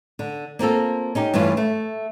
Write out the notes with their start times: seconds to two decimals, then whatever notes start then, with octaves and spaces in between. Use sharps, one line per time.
0.19 D3
0.59 A#3 C4 F4 A4
1.15 C#4 D#4 G4
1.34 G2 E3 A3 C#4 F4
1.57 A3